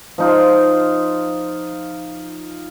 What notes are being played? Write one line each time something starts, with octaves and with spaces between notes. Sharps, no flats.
F3 D#4 F4